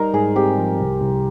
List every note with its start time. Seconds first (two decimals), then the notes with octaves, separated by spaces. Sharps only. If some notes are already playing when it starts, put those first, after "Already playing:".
Already playing: G3 D#4 A#4 C5
0.14 G#2 G#4
0.36 C4 G4
0.58 F3
0.80 C2
1.02 C2